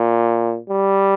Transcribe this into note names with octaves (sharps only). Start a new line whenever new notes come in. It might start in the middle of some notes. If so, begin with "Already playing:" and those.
Already playing: A#2
G3